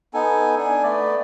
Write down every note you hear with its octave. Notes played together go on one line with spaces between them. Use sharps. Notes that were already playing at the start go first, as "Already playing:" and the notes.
B3 D#4 A4 G#5
D4 G#5
A3 B3 D5